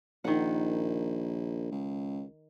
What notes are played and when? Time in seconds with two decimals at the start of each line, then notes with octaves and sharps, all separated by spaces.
0.24 A#1 D#3 F#5
1.71 C#2